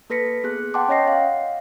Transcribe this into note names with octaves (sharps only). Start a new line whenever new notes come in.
A#3 A4 B4 A#6 B6 C#7
B3 G#4 F#6
F#5 G5 A5 C6 D6
C#4 C#5 D#5 A#6 C7
F5